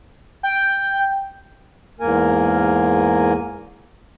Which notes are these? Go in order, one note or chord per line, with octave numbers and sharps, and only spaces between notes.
G5
E2 G#2 A#3 A#4 G#5